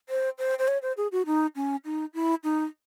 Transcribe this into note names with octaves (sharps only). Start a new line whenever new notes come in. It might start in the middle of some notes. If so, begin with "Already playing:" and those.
C5
C5
C5
C#5
C5
G#4
F#4
D#4
C#4
D#4
E4
D#4